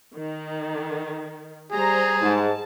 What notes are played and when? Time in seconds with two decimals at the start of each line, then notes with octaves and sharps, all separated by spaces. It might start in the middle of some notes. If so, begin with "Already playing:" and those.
0.16 D#3
1.71 G3 G#4 C5 A#5
2.21 G#2 A5